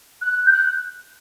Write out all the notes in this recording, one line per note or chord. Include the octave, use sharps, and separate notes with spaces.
F#6
G6
F#6